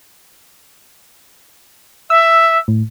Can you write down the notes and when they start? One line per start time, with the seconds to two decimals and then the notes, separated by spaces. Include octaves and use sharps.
2.10 E5 E6
2.68 A2